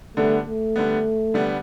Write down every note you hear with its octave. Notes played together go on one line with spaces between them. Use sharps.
D3 G3 A3 B3
A3
D3 G3 B3
D3 G3 B3